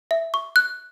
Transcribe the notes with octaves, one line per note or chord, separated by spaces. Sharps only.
E5
C#6
F#6